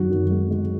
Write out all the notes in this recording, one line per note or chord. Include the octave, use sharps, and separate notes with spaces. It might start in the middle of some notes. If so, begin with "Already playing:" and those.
Already playing: F#2 D#3 F#4
F#2
G#3
G#3